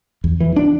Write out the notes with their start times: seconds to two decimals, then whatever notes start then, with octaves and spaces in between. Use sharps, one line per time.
0.24 E2
0.40 E3
0.56 D4